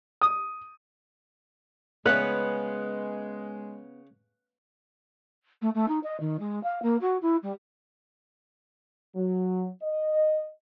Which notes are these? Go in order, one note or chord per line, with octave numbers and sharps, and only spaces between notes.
D#6
C#3 G#3 B3 C#4 F#6
A3
A3
D#4
D#5
D#3
G#3
F5
A#3
F#4
E4
G3
F#3
D#5